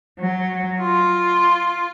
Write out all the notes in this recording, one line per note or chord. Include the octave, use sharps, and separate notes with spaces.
F#3
F4